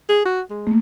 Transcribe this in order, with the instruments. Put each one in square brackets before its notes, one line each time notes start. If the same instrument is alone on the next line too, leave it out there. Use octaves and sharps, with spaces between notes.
[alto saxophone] G#4
F#4
G#3
[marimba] A3 A#3